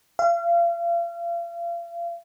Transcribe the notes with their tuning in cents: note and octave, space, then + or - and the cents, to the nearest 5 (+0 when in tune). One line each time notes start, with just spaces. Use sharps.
F5 -35